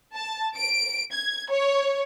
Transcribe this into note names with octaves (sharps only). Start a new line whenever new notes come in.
A5
D7
G#6
C#5